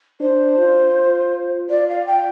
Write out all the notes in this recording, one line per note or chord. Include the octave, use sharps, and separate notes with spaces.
D4 C5
F4
F4 D5
F5
G5